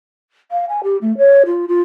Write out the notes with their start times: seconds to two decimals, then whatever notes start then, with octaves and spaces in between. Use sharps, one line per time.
0.51 F5
0.69 G#5
0.83 G4
1.02 A3
1.18 C#5
1.46 F4
1.68 F4